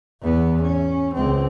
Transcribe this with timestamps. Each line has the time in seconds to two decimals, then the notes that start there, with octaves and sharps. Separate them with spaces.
0.22 E2 B3
0.63 C#4
1.15 C#2 C4